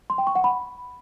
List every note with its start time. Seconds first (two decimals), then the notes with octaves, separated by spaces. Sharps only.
0.10 C6
0.18 G5
0.27 C#6
0.35 F#5
0.44 B5